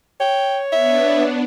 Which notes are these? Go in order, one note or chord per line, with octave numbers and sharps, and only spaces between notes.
C#5 G5
B3 D4 E5